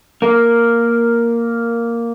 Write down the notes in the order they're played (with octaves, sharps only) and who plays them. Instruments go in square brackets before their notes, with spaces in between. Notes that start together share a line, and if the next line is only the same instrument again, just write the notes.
[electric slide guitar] A#3 A#4